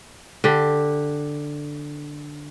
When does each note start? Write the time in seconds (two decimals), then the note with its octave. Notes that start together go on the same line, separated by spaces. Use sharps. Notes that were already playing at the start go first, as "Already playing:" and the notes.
0.44 D3 G4